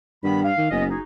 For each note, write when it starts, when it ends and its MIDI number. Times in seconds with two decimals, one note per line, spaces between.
0.23 0.51 43
0.23 0.43 51
0.23 0.43 59
0.23 0.43 83
0.44 0.71 77
0.57 0.70 51
0.71 0.94 30
0.71 0.84 59
0.71 0.84 61
0.71 0.84 75
0.89 0.99 63
0.89 0.99 66
0.89 0.99 68